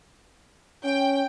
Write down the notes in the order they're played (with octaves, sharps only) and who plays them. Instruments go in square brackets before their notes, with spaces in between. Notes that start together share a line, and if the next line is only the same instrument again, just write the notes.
[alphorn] C#4 [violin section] G5